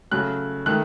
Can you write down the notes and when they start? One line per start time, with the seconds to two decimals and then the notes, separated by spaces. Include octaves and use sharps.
0.11 C#3 F#3 A3 F#6
0.66 D#3 A3 F#6